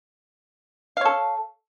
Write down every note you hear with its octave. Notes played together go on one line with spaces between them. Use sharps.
A4 C#5 F5